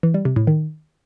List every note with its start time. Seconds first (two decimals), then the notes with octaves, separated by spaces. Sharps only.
0.03 E3
0.14 G3
0.25 C3
0.36 A2
0.47 D#3